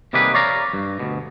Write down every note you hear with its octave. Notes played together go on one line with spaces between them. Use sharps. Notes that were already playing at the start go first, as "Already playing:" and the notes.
C3 D#3 G3 A#3 G#4 B4
C#5 D5 F5 A#5
G2
D2 B2